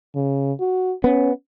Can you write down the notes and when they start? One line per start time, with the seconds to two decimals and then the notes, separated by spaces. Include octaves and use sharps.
0.15 C#3
0.60 F#4
1.04 B3 C#4